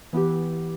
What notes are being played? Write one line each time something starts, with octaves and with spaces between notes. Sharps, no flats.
E3 B3 E4 G4